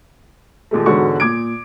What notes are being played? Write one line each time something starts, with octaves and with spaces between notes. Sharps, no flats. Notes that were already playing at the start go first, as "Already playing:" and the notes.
D#2 A#2 G#3 A3
E1 G#2 D3 F#4 C#6
A#2 D6 G#6 D7